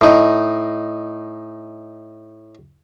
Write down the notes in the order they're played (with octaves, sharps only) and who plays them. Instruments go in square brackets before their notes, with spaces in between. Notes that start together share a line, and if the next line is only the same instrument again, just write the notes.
[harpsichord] A2 D#4